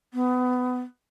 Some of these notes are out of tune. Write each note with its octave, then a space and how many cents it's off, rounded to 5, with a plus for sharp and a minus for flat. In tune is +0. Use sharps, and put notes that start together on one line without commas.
B3 +25